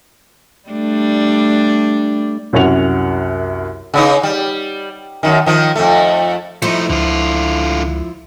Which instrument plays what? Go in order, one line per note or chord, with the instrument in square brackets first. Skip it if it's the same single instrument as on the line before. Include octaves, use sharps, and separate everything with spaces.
[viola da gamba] G3 A3 D4
[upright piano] C2 F#2 C#4 F#4 F#5 F7
[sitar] C#3 B3 D#4
G3
F#2 D#3
D#3 F3
F2 A3
[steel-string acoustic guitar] F3 E4 [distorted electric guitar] A3 D#4
[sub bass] C#2 [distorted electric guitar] D3 F4